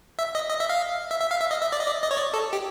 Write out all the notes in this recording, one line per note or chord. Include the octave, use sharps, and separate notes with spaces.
E5
D#5
D#5
E5
F5
E5
E5
F5
E5
D#5
E5
D5
D#5
D5
D#5
C#5
D5
A4
G4